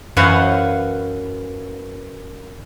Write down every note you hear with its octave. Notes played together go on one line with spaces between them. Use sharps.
F#2 E3 B4 C5 F5 F#5 C#6